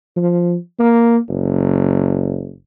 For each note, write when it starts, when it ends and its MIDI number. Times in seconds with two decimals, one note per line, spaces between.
0.16 0.56 53
0.79 1.18 58
1.29 2.53 30